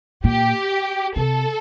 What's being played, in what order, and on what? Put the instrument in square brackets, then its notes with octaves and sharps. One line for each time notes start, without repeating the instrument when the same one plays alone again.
[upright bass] A#2 [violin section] G4
[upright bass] C3 [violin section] A4